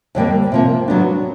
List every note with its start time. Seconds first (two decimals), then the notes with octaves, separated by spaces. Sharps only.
0.15 F2 D3 G3 A#3
0.52 C3 F3 A#3
0.88 F#3 B3 D4